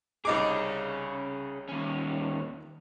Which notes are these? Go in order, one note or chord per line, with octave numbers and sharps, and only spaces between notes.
C2 C#4 D#4 G#4 D6
D#2 C#4